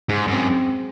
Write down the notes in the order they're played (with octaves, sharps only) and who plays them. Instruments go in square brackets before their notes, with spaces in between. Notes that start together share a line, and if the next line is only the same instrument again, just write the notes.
[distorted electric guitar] G#2 [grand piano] G#3
[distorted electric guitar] F#2
[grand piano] C4